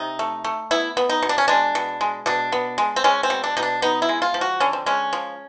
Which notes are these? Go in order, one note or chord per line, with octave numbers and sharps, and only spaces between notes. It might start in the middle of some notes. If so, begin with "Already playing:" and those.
Already playing: C3 D#4
A3
A3
B3 E4
B3
D#4
B2
D4
C#4
G#3 D4
B2
G#3
B2 D4
B3
G#3
C4
G#3 C#4
C4
B2
D4
B2 D#4
D4
B3 D#4
E4
G#3
F4
F3
F#4
D3 C#4
C4
G#3 C#4
F3